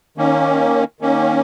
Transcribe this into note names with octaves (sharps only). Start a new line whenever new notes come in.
D#3 A#3 C#4
D#3 A#3 C#4